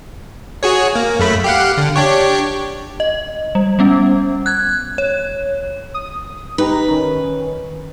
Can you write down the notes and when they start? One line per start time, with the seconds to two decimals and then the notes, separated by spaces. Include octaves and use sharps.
0.63 F#4 G#4 C#5
0.95 A#3
1.19 F#2 A3 B5
1.44 G4 F5 F#5
1.78 D3
1.96 D4 G4 C#5
3.00 D#5
3.55 G3
3.79 G3 B3 C#4
4.46 F#6 G#6
4.98 C#5
5.94 D#6
6.58 D#4 G4 B4 A#5
6.88 D#3 C#4